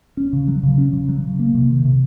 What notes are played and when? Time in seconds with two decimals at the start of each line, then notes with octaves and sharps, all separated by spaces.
0.17 C#4
0.33 C#3
0.48 F#3
0.63 C#3
0.78 C#4
0.93 C#3
1.09 F#3
1.24 C#3
1.39 A#3
1.55 C3
1.70 D#3
1.85 C3